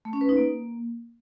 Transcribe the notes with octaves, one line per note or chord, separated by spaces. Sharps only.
A3
C#4
B4
D#4
A#3